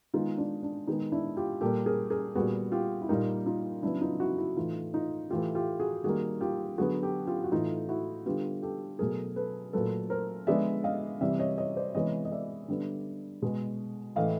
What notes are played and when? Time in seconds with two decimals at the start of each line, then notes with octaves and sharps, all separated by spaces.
0.14 D#3 G#3 B3 D#4 F4
0.38 D4
0.63 D4
0.87 D#3 G#3 B3 D#4
1.12 D4 E4
1.37 F4 G4
1.61 A#2 G3 A#3 G4 A4
1.86 G#4 A#4
2.10 G#4 A#4
2.35 A#2 G3 B3 F#4 G#4
2.72 F4 G4
3.02 E4
3.09 A#2 G3 A#3 D#4 F4
3.46 D#4 F4
3.83 C#3 F#3 B3 D4 E4
4.01 D#4 F4
4.20 E4 F#4
4.38 E4 F#4
4.56 A2 E3 A3 D#4 F4
4.94 D#4 F4
5.30 A2 E3 A3 F4 G4
5.55 F4 G4
5.80 F#4 G#4
6.04 D#3 G3 A#3 F#4 G#4
6.41 F4 G4
6.78 D3 F#3 B3 F#4 G#4
7.02 G4 A4
7.27 F4 G4
7.44 F#4
7.52 A2 E3 A3 D#4 F4
7.89 E4 F#4
8.26 D3 G3 B3 F4 G4
8.63 G4 A4
8.99 B2 F#3 A3 G#4 A#4
9.36 A4 B4
9.73 A#2 F#3 A3 A4 B4
10.10 A#4 C5
10.47 D3 F3 G#3 B3 D5 E5
10.84 D#5 F5
11.21 C3 E3 G3 D5 E5
11.39 C#5 D#5
11.58 C#5 D#5
11.76 C5 D5
11.95 C3 E3 G#3 B3 C#5 D#5
12.25 D#5
12.31 D5 E5
12.69 D3 G3 B3
13.42 B2 G#3 B3
14.16 A2 E3 A3 D#5 F5